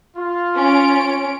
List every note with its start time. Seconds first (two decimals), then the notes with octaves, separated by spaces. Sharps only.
0.17 F4
0.56 C#4 D7